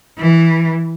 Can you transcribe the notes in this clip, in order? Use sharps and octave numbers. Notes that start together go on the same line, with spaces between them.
E3